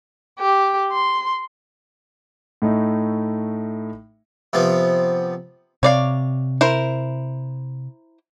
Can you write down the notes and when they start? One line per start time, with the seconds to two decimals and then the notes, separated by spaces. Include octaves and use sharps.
0.39 G4
0.92 C6
2.62 A2 A3 D#4
4.53 C3 F3 B3
5.83 C3 C#5 D5 F5
6.61 E4 A#4 C5